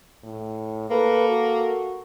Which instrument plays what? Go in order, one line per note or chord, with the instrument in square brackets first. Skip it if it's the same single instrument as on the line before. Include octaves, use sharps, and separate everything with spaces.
[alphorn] A2
[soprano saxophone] A#3 [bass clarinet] A4 [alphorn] B4
[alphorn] F#4